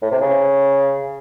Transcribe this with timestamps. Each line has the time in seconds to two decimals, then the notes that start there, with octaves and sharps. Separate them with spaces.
0.02 A2
0.11 C3
0.21 C#3